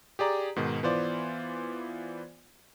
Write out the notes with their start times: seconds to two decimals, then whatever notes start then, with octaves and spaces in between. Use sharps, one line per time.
0.19 G4 G#4 D5 A#5
0.56 G#2 B2 D#3
0.83 E3 B3 F4 C5 D5